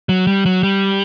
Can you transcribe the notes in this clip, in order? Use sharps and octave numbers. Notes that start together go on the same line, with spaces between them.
F#3
G3
F#3
G3